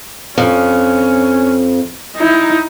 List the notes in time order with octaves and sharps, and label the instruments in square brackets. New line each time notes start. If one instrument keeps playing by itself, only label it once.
[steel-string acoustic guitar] F2 [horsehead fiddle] C#4
[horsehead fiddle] D#4 E4